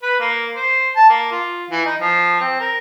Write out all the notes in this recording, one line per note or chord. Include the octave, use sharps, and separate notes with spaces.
B4
A#3
C5
A5
A#3
F4
E3
D#4
F3
C4
A#4